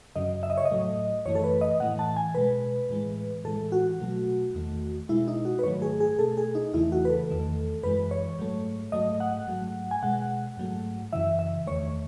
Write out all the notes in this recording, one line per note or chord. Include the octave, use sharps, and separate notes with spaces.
F#2 C#3 F#3 D#5
E5
D#5
C#5
D#5
A2 F#3 A3
F#2 E3 A3 C#5
A4
B4
D#5
A2 E3 A3 F#5
A5
G#5
B2 G#3 B4
A2 E3 G#3
A2 E3 G#3 A4
F#4
B2 F#3 A3
E2 D#3 A3
B2 G#3 E4
D#4
F#4
B4
G#2 D#3 F#3 A3 C#5
G#4
G#4
B2 A3 A4
G#4
D#4
E2 C#3 E3 A3 E4
F#4
B4
A4
E2 D#3 A3
F#2 E3 G#3 B4
C#5
G#2 F#3 A3
G#2 F#3 A3 D#5
F#5
G#2 F#3 A3
G#5
B2 G#3 F#5
G#2 F#3 A3
F#2 C#3 E3 E5
E5
E2 D#3 A3 C#5